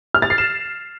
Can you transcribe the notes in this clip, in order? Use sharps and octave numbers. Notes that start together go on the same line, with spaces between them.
F6
A6
C7
E7